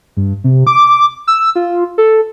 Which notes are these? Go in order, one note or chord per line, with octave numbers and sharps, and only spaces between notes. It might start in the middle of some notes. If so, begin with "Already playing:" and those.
G2
C3
D6
E6
F4
A4